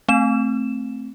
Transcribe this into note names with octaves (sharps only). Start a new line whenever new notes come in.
A3 C4 E7